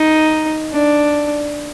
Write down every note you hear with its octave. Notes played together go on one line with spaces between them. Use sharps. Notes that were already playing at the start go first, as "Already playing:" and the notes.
Already playing: D#4
D4